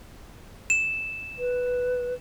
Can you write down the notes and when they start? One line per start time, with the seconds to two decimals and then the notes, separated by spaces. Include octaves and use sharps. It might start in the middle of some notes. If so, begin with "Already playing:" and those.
0.70 E7
1.39 B4